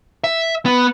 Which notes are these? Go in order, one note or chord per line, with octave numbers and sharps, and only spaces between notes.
E5
B3